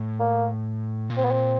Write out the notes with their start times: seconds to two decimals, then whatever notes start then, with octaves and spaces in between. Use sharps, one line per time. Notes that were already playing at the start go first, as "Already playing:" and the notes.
Already playing: A2
0.20 A#3
1.10 A#2
1.17 C4
1.25 B3
1.31 C4